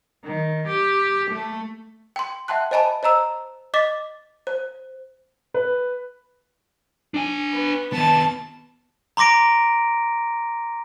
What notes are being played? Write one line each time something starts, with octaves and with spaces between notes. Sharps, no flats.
D#3
G4
A3
G5 C6
E5 F#5 G5 A5 C6 F#6
C5 D#5 G#5 A5 B5
C5 D#5 A#5 E6
D#5 D6 A6 B6
C5
B4
D4 G#5
B3
D#3 B3 A5
A#5 C6 D6 A#6 D7